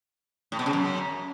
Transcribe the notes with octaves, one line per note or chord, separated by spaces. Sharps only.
A2
B2
C#3
F#2